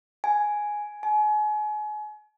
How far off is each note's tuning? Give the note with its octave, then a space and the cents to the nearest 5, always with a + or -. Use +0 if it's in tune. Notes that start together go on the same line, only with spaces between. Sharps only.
G#5 +5
G#5 +35